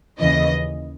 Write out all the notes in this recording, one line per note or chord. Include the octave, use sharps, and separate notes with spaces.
D#2 C#3 E3 D#5